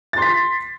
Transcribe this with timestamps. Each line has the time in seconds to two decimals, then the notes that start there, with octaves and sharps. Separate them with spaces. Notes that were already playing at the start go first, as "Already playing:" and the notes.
0.13 A6
0.18 C6
0.22 B6